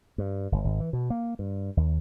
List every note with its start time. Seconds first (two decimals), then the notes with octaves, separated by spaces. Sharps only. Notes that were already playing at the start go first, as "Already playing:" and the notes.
0.18 G2
0.52 G1
0.64 G#1
0.80 E3
0.93 B2
1.10 A#3
1.39 G2
1.77 D#2